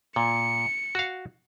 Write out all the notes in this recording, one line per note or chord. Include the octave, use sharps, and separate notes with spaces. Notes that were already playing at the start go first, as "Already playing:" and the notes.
A#2 C#7
F#4 F5